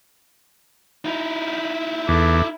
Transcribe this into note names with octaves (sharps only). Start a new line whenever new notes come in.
D#4 E4
E2 A4 D6